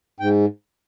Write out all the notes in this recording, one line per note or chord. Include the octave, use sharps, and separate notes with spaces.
G#2 G5